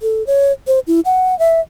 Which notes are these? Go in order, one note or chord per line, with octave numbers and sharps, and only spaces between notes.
A4
C#5
C5
E4
F#5
E5